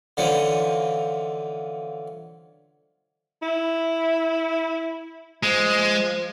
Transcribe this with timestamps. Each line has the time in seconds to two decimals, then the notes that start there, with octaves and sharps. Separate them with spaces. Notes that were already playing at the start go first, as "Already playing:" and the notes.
0.17 D3 E3 F3 B3 C#4
3.42 E4
5.43 F3 G#3